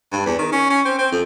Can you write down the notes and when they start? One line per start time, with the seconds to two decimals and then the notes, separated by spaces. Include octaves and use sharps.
0.12 G2
0.26 E2
0.39 D#3
0.52 C#4
0.70 C#4
0.85 C4
0.98 C4
1.12 F2